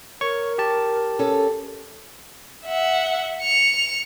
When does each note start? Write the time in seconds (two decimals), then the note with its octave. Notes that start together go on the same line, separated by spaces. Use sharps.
0.21 A#4 C#5 C#6
0.58 G4 A5
1.19 C#4 A4
2.65 E5 F#5
3.42 C#7 F7